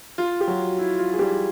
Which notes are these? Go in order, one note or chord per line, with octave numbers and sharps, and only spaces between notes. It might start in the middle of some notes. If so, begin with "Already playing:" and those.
F4
G4
F#3 F#4
E4
F4
G#4
G3 G4